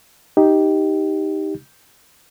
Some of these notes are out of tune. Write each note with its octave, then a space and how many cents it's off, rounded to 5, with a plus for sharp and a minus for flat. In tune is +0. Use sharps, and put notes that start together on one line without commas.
D#4 +5 G4 +0